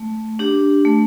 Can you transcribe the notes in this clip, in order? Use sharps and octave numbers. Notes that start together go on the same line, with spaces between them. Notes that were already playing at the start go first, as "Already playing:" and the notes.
Already playing: A3
D4 G4
A3